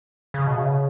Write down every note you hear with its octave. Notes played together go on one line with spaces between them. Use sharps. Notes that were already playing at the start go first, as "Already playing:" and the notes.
C#3
B2
C#3